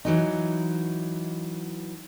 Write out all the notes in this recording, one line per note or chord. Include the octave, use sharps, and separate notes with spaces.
E3 F#3 D#4